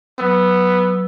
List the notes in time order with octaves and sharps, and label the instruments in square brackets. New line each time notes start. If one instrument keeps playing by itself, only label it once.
[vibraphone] F#3 B4 E6 [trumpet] B3